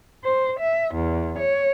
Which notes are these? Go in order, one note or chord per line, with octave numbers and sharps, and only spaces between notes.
C5
E5
E2
C#5